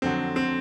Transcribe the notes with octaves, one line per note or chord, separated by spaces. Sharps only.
F2 D3 F#3 C4
C4